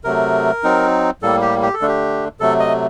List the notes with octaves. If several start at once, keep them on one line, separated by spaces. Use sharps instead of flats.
C3 F#3 A3 A#4
F#3 C4 D#4
A2 G3 A#3 A4
G4
G4
A4
D3 A3 D4
G4
C3 F#3 A3 A4
D#5